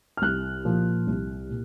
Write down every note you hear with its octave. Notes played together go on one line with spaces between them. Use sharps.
F6
C2 F#6
A#2 F3
C2
A#2